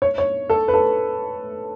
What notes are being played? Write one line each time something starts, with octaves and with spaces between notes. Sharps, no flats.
C#5
C#5
A4
B4
A4